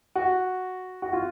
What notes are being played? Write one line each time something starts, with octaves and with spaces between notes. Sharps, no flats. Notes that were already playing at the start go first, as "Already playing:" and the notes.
F#4
F#4
F4